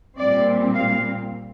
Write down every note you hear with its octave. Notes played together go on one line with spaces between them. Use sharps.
A#2 G3 C4 D5
F5